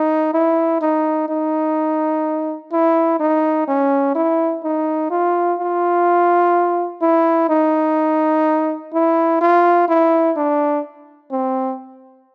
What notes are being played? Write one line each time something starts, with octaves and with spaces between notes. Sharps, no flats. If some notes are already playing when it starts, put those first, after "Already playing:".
Already playing: D#4
E4
D#4
D#4
E4
D#4
C#4
E4
D#4
F4
F4
E4
D#4
E4
F4
E4
D4
C4